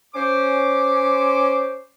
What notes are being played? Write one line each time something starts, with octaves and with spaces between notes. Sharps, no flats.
C#4 C5 D6